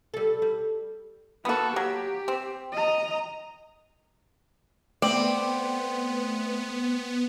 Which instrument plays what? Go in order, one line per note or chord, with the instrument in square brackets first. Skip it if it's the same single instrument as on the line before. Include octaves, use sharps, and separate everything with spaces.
[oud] G3 A4
G3
[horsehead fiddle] A#3 A4 [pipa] B3 F#4
[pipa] F#3 [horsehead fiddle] G4
[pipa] C4
[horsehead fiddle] D#5 A#5
[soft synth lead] A3 [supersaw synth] B3 [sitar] C4 [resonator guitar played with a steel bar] D5